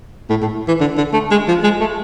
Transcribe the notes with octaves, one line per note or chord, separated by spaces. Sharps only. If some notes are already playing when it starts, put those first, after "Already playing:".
A2
A2
E3
D3
D3
A3
G#3
F3
G#3
A3